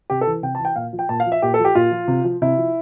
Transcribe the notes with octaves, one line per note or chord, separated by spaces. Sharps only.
C3 G4
A4
E3
C3 G5
A5
E3
G5
A#2 F5
F3
G5
A#2 A5
F5
F3
E5
A#2 G4
A4
F3
G4
A#2 F4
F3
C3
F3
C3 E4
F3